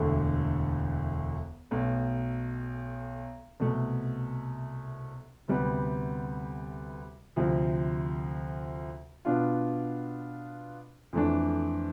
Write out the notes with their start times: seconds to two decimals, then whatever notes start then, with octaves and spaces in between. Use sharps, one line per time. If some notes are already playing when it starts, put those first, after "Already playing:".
Already playing: E1 D2 D3 A3
1.71 B1 B2 A3
3.60 C2 B2 A3
5.48 D2 C3 G3 B3
7.36 D2 C3 F3
9.25 B2 B3 D4 F4
11.13 F2 E3 A3 D4